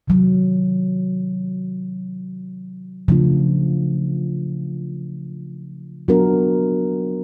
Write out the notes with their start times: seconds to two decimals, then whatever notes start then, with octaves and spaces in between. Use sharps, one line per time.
0.08 C3 D#3 F#3
3.08 C#3 F3 A3 D4 F4
6.08 F#3 B3 D4 F#4 A#4